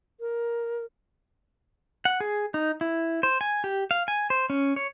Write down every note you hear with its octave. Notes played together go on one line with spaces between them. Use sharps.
A#4
F#5
G#4
D#4
E4
C5
G#5
G4
F5
G#5
C5
C#4
C#5